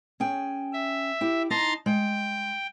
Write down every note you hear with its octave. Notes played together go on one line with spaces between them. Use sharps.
C#4 G#4 G5
E5
E4 G4
D#4 A5 A#5 C6 A6
G#3 G5